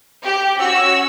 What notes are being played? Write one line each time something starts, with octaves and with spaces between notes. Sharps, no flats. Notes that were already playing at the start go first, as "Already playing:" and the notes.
G4
C#4 F#4 E6